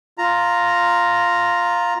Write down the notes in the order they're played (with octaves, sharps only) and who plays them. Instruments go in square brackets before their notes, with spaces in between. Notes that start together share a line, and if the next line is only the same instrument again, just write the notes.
[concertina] F4 A#5